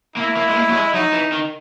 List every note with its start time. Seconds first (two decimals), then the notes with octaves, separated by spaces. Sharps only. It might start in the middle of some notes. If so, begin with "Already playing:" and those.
0.16 A#3 E4
0.36 A#3
0.49 G#3
0.55 A#3
0.70 F#3
0.74 G#3
0.93 F#3 D#4
1.13 E3
1.32 D#3